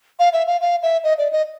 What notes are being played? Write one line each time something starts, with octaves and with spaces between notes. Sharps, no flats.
F5
E5
F5
F5
E5
D#5
D5
D#5